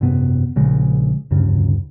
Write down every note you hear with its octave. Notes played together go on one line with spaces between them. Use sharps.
G#1 F#2 C3 B3
A#1 C#3 G#3
F1 D2 G2 C#3